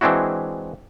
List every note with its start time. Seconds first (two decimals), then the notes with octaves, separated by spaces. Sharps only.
0.01 E3 G#3 C4 D4 E4 F#4